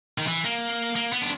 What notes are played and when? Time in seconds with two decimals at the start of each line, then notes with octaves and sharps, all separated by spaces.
0.18 D#3
0.27 E3
0.44 A#3
0.96 A#3
1.13 B3
1.21 D4